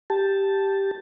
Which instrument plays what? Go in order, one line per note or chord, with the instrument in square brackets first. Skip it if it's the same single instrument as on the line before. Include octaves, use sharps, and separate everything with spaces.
[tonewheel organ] G4 A5